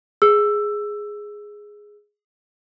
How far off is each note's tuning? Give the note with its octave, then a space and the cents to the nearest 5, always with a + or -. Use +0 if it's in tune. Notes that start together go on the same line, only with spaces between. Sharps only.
G#4 +0 E6 +10